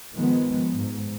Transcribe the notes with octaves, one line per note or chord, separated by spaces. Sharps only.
D#3 F3 G#3 B3
G#2